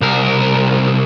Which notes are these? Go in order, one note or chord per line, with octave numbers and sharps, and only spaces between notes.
C2 A#4